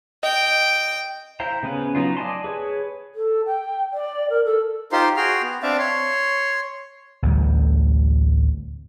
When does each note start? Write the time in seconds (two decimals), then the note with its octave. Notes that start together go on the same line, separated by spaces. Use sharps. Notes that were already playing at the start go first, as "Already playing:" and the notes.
0.23 D#5 G5
1.40 E4 C5 F5 G5 A#5
1.63 C#3 B3 C#4 B4
1.95 F#3 B3 D#4 F4
2.17 D5 D#5 G#5 A5 C6
2.44 G#4 B4 C#5
3.15 A4
3.46 G5
3.93 D5
4.30 A#4
4.44 A4
4.92 D#4 F4 G4 C5 C6
5.17 F#4 G#4 G5 C6 F6
5.42 B3
5.63 C4 D4 D5 E5 F5
5.79 C#5 C6
7.23 A1 D2 G3